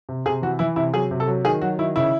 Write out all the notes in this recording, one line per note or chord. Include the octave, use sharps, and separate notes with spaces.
C3
C3 G#4
E3 F#4
E3 E4
C3 E4
F#3 G#4
C3
A4
F#3
D#3 G#4
F#3 F#4
D#3 E4
C#3 E4